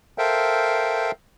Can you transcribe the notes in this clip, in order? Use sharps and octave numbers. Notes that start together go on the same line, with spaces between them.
A4 A#4 C5 E5 F5 G5